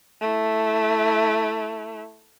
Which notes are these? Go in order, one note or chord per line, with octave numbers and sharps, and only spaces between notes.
A3 E4